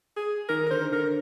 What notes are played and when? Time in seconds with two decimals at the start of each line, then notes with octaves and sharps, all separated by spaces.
0.16 G#4
0.49 D#3 A#4
0.66 A#4
0.71 D3 C5
0.92 D3 A#4